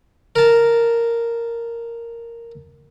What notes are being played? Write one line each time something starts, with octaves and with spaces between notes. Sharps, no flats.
A#4 A5